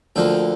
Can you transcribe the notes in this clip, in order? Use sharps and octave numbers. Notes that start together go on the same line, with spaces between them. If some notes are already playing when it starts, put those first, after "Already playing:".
D2 D3 F3 A#3 G5